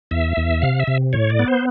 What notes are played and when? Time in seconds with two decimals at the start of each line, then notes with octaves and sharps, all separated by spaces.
0.11 E2 E5
0.37 E2
0.62 C3 F5
0.80 E5
0.87 C3
1.13 A2 C#5
1.30 D5
1.39 B3
1.48 C5